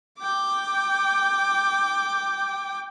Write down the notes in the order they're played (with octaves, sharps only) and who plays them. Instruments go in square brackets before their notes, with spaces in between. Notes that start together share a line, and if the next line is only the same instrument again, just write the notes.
[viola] G5 D6